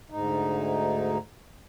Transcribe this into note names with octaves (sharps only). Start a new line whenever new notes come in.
D2 G#2 D#4